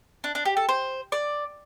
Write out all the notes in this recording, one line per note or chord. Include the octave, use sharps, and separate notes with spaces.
D4
D4
G4
A4
C5
D5